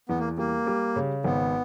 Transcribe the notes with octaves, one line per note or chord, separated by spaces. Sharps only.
E2 B3
A#3
G3 A#3
G3
C#3
G#1 B3